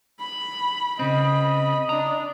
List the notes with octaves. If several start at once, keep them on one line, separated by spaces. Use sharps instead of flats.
B5
C#3 C4 D#5 B5
D4 A#5